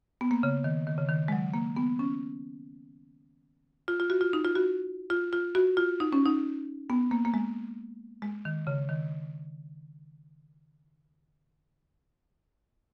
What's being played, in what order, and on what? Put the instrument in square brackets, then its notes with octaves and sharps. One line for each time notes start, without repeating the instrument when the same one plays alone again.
[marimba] B3
A#3
C#3
D#3
D#3
C#3
D#3
G#3
F#3
A#3
B3
C#4
F4
F4
F#4
F4
D#4
F4
F#4
F4
F4
F#4
F4
D#4
C#4
D#4
B3
A#3
A#3
G#3
G#3
D#3
C#3
D#3